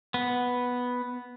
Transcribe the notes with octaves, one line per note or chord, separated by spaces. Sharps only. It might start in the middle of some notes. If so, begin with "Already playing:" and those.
B3